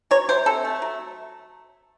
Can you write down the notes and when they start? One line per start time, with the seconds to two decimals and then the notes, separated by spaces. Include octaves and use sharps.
0.11 F#3 C#5
0.29 C3 C5
0.46 C3 A4
0.65 A3
0.82 F#3